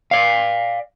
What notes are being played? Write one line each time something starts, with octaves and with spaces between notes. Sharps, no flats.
D5 F5